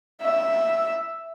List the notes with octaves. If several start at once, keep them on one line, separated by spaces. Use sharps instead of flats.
E5